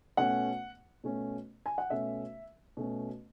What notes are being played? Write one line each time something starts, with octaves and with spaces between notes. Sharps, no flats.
B2 A3 C#4 F#5
B2 A3 C#4
G#5
F#5
B2 A3 C#4 E5
B2 A3 C#4